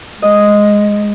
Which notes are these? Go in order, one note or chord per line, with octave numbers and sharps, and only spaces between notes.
G#3 D#5